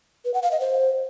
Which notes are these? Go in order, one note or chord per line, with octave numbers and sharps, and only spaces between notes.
B4
F#5
F5
D#5
C5